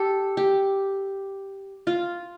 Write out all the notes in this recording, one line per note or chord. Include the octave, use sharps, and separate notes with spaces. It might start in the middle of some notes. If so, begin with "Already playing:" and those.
Already playing: G4 A4
G4
F4